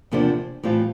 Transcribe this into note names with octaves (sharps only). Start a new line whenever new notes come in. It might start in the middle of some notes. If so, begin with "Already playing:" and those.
E2 C3 F3 A#3 D4
A2 E3 G3 C4 F4